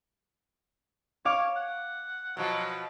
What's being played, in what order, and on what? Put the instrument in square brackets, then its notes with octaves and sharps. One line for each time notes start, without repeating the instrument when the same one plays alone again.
[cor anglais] C#5 [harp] F5 D6
[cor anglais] F#5
[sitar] B2 F3 [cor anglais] F#3